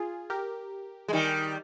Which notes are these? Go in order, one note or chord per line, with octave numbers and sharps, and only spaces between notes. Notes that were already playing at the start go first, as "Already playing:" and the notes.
Already playing: F4 G#4
G4 A#4
G#3
D#3 G3